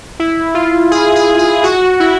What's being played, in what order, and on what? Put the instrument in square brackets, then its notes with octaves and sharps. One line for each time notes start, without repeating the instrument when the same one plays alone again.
[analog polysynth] E4
F4
G#4
G#4
G#4
F#4
E4